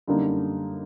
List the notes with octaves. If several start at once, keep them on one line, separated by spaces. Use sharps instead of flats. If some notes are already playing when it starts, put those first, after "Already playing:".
F#2 D3 G3 A#3 D#4